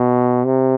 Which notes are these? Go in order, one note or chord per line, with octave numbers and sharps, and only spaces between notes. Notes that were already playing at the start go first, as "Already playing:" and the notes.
Already playing: B2
C3